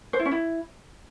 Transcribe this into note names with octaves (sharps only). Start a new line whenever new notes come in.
C5
E4
C#4
E4